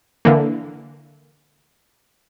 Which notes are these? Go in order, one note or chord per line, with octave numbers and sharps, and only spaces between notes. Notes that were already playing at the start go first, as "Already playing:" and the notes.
D3 E3 A#3